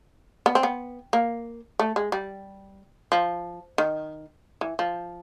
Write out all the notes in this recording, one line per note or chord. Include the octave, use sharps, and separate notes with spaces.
B3
C4
B3
A#3
A3
G#3
G3
F3
D#3
E3
F3